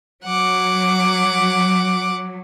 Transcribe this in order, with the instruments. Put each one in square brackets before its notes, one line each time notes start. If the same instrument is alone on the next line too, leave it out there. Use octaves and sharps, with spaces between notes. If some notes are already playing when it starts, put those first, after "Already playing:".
[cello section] F#3 [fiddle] F#5 D6